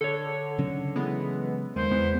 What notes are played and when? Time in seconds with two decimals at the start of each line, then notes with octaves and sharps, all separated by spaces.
0.01 D3 A4 C#5
0.58 C#3 F#3 C#4
0.96 E3 G#3 B3
1.76 D#2 G#3 C5
1.91 E2 B3